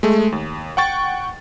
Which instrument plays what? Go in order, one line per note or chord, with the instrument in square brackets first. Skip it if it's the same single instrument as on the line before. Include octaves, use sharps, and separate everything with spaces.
[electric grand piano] G#3 A3
D#2
F#5 G5 C#6 A6